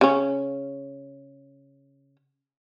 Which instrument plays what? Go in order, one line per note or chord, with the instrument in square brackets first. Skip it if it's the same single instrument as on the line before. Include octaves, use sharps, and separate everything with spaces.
[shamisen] C#3 C#4